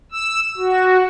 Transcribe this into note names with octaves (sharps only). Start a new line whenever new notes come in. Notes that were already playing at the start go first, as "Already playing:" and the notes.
E6
F#4